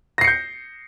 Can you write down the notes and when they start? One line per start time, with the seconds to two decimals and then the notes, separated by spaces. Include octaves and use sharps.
0.18 A#6
0.21 C7
0.24 C#7
0.27 G6